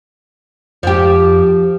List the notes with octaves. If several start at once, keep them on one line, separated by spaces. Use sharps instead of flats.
F2 F3 G4